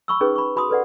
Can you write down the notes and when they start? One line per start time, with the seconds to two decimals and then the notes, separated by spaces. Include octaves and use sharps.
0.08 B5 C#6 E6
0.21 C#4 D#4 G#4 B4
0.35 B5 C#6
0.56 F#4 B5 C6 D#6
0.69 A4 B4 D5 F#5